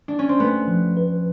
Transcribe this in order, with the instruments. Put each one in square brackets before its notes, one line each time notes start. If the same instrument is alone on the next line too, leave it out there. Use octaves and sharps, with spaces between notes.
[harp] D4
C#4
C4
[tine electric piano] A3 [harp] B3
[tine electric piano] F3
B4